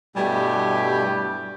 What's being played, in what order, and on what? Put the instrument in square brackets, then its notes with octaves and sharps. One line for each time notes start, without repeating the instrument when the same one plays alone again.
[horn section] G2 E4 G4 [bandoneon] B2 A3 G#5 [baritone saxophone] G3